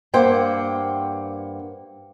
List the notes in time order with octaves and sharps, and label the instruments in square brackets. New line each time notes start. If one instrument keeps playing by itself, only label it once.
[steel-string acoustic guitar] G2 A#3 C5 F#5 G5